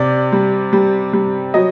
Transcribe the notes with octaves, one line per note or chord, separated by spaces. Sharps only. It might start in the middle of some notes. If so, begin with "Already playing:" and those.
Already playing: C3 D5
G3
G3
G3
F#3 D#5